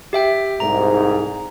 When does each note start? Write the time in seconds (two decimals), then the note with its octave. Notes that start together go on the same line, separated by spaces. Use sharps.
0.13 G4 E5 G5
0.60 C2 G#2 A#5